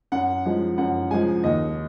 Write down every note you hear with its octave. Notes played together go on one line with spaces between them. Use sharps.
F#2 F#5
F3 G#3
F#2 F#5
F3 G#3 G#5
D#2 D#5